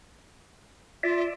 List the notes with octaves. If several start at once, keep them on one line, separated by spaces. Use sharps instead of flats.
F4 D5 E5